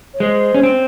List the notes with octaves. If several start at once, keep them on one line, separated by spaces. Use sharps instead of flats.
C#5
G#3 C5
C#4
C4